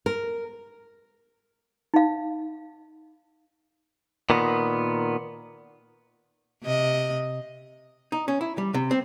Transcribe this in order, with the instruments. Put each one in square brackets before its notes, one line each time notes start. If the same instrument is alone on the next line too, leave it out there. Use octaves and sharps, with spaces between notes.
[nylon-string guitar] A#4
[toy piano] D#4 F5
[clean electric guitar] A#2 D#3 B3
[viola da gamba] C3 D#5
[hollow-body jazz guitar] D#4
C#4
E4
G3
C3
C4